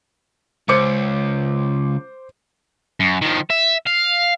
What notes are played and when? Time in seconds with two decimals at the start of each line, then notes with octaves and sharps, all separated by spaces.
0.69 C#2 C5 D6 C#7
3.00 F#2
3.22 D#3 F3
3.50 E5
3.87 F5